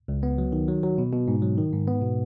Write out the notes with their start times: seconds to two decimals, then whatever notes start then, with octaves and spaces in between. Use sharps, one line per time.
0.08 C#2
0.23 B3
0.38 F#3
0.52 D#3
0.68 F#3
0.83 F#3
0.98 B2
1.13 B2
1.28 G#2
1.42 F#3
1.58 D#3
1.73 G#2
1.88 B3
2.02 B2